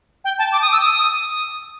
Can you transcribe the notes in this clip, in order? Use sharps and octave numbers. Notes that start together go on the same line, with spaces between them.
G5
A5
D6
D#6
E6
D#6